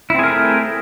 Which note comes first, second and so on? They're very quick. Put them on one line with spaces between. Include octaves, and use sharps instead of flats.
E4 C4 G#4 A#4 A3